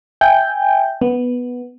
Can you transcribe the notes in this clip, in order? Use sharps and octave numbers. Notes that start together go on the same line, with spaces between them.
E5 G5 G#5 G6
B3